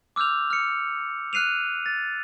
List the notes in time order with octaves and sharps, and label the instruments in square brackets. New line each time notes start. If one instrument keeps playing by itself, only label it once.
[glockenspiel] D6 E6 F6 G6 F7
F6 C#7
F6 F#6 C7 D#7 F7
A6